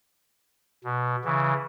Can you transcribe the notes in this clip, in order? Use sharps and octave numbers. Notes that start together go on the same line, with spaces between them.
B2
C#3 E3